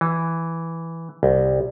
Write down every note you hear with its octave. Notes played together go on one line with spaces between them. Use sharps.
E3
C2